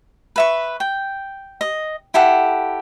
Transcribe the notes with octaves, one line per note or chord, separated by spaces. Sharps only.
B4 E5 C#6
G5
D#5
E4 G4 A4 F#5